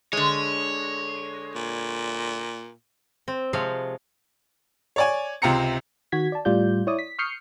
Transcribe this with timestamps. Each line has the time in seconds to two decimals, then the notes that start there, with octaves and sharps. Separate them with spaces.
0.13 D3 G#3 C#5
1.55 A#2
3.28 C4
3.53 C3 F3 G#3 C#5 F5
4.96 C#5 D5 G#5
5.42 C#2 C3 C4 A#5 C#7
6.12 D#3 F#4 G#6 B6
6.32 D5 A5
6.45 A2 G3 F4 D5 G6
6.87 E4 C#5 D5 D#6
6.99 B6
7.19 C#6 D#6 F6 G6 C7 C#7